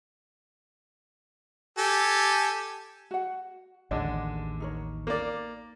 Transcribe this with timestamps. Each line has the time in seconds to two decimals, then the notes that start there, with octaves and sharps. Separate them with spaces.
1.78 G4 A4 G#5
3.11 F#4 F#5
3.91 A1 D#2 D3 G#3 D4 D#5
4.60 D#4 A#4 C#5
5.07 A#3 D5